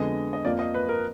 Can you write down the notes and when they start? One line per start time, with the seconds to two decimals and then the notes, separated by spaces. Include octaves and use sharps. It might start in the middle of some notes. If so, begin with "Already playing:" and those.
Already playing: F2 D3 G#3 B3 D#5
0.33 D#5
0.45 F2 F3 A#3 D5
0.59 D#5
0.74 B4
0.89 A#4